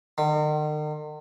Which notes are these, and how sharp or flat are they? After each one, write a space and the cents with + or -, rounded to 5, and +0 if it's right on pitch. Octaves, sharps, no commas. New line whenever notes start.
D#3 -45